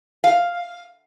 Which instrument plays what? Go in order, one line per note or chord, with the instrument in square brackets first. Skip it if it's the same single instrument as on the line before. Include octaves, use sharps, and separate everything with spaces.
[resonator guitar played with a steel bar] F5